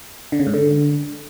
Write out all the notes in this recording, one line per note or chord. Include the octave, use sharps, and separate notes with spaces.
D3
C#3
G#2
D3